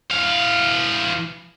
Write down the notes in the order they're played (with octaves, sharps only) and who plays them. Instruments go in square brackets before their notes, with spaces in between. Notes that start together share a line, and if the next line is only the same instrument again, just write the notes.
[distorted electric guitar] E3 F5